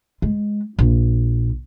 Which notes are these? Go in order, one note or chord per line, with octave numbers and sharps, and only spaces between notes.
G#3
A#1